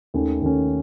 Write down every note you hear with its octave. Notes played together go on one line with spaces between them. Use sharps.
D#2 D#3 A3 C#4
D#2 D#3 A3 C#4